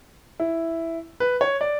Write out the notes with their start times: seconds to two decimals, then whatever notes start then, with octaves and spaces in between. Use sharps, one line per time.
0.40 E4
1.20 B4
1.41 C#5
1.61 D5